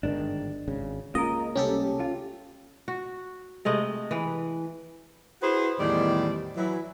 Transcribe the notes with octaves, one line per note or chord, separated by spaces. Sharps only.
G1 G#2 D#3 D4
G#1 C#3
C#2 C#3 A#3 F4 A#4 D#5
C2 C#4 G4 A4
F4
F#4
C3 G#3 A3 D#5
E3 B4
E4 F#4 G#4 B4 C5
E2 A2 D#3 G3 C5 D5
E3 F#3 E4